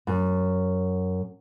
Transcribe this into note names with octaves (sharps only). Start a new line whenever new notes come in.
F#2